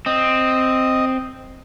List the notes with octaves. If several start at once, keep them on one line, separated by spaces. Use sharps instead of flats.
C4 D#5